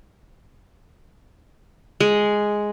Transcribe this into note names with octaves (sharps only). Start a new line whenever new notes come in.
G#3